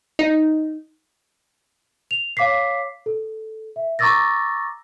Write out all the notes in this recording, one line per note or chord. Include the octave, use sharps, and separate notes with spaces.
D#4
F7
C#5 F5 D6 B6 C7
A4
E5
A#5 C#6 D6 E6 A6 A#6